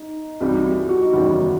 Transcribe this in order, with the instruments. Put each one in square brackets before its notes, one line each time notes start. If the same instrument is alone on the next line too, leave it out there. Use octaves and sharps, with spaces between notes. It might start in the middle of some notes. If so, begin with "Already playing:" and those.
Already playing: [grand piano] D#4
[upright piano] C2 C3 E3 G3 D#4 [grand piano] F#4
[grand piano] G4
F#4
D#4
[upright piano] F#1 E2 D#3 G3 B3 [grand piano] E4